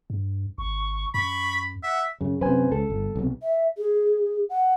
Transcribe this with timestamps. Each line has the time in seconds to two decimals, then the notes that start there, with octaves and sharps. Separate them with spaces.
0.10 G2
0.58 G#1 C#6
1.14 F#2 B5 C#6
1.83 E5 F#5
2.21 F#2 C#3
2.41 F#2 C3 B4 C5 G#5
2.72 C#2 A4
2.90 G1
3.16 B1 C3
3.42 E5
3.77 G#4
4.49 F#5